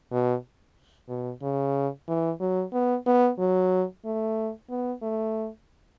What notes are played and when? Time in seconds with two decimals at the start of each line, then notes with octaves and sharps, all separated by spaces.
0.11 B2
1.09 B2
1.42 C#3
2.08 E3
2.40 F#3
2.73 B3
3.07 B3
3.38 F#3
4.05 A3
4.70 B3
5.02 A3